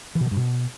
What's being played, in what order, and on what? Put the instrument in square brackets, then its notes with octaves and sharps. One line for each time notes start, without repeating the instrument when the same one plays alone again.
[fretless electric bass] E3
B2
E3
G2
B2